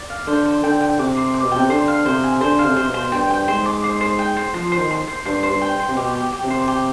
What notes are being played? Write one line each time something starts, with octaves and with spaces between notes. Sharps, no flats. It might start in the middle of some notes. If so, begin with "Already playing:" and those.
Already playing: D5
F5
D3 C5
C5
D3 G5
G5
C3 D6
C5
D6
B2
C3 G5
D3 C5
F5
C3 C5
G#5
D3 C5
F5
C3
C3 C5
B2
C5
G2 G5
G5
G#2 C5
D6
C5
C5
G5
C5
F3 C5
C5
D#3
C6
C5
G2 C5
C5
G2
G5
C6
C3
B2 G4
G4
G4
C3
C5
G4